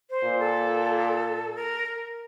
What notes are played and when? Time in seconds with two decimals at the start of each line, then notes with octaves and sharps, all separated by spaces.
0.10 C5
0.24 A#2
0.39 A4
1.56 A#4